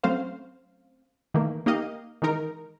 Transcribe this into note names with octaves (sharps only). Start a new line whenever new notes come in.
F#3 A3 C4 C#4 C5 F5
D#3 E3 A3 A#3
A#3 D#4 G4 D#5 F5
D#3 E3 G#3 D#4 A#4